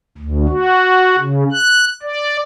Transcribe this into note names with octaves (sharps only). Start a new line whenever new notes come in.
D2
F#4
C#3
F#6
D5